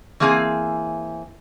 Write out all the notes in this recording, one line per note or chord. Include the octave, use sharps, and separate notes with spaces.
E3 A#3 C4 G#4 E5 G#5